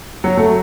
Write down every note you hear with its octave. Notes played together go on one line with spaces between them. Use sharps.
F#3
F#3 A3